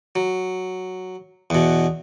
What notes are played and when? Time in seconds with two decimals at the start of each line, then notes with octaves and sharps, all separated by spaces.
0.15 F#3
1.50 E2 B2